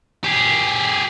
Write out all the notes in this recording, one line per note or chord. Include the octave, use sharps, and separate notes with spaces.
G4 G#4